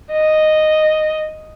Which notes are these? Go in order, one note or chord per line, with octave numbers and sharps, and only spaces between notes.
D#5